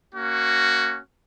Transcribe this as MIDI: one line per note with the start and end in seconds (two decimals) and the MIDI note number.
0.15 0.99 58
0.15 0.99 61
0.15 0.99 66